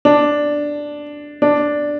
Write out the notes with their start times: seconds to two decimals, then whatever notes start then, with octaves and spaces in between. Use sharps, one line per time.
0.05 D4
1.42 D4